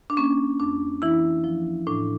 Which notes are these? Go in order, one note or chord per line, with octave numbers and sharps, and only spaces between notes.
D4
A#3 C#4
F2 D4
E3 E4
F3
A2 D4